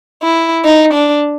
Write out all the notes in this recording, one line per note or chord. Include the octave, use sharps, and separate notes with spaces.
E4
D#4
D4